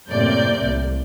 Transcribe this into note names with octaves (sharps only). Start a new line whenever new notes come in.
F#2 A2 C3 A#3 D5 G6
C2